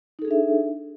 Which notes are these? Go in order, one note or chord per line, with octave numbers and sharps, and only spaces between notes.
D4 D#4 G#4 A4 E5